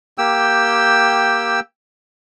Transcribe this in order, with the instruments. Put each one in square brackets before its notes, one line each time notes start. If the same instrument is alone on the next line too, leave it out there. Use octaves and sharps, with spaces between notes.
[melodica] A#3 G4 G5 E6